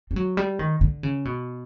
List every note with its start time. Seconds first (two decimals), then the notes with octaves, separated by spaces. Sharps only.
0.11 G3
0.16 F#3
0.37 G3
0.59 D#3
0.81 D3
1.03 C#3
1.25 B2